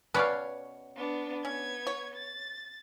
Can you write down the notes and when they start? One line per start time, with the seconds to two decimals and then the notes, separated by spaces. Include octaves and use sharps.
0.14 B2 C#4 B4 C#5 D5 F5
0.96 B3 D4
1.45 B3 C#4 G#6
1.87 C#5
2.15 A6